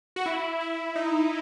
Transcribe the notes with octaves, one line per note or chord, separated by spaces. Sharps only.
F#4
E4
E4
D#4